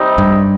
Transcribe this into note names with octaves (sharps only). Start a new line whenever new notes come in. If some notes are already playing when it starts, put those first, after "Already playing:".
Already playing: C3 G3 C4 D#4
G2